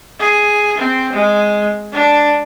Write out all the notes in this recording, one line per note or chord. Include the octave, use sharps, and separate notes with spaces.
G#4
C4
G#3
D4